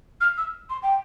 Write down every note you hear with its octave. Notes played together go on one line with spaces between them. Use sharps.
F6
E6
C6
G5